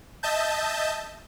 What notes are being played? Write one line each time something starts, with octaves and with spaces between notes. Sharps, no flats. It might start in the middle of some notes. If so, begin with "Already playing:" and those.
D#5 E5 A5 G6